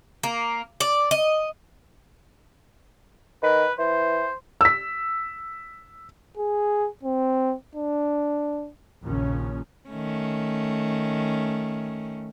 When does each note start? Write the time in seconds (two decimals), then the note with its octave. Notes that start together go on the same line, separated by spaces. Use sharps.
0.23 A#3
0.80 D5
1.11 D#5
3.43 D#3 B4
3.78 E3 C5
4.61 E6 B6
6.37 G#4
7.03 C4
7.75 D4
9.04 A#1 D#2 A#2 C#3 F3 C#4
9.89 D#3 A3 C#4